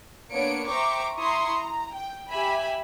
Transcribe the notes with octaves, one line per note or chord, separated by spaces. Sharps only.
A#3 B3 D4 C#5 C#7 D7
C5 E5 G5 A#5 C#6 D6
E4 A#5 C6 C#6 D#6
A#5
G5
G4 E5 G#5 B5